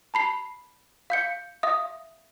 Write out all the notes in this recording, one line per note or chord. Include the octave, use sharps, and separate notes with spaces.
A5 B5 C7
F5 G6 C#7
E5 F5 D#6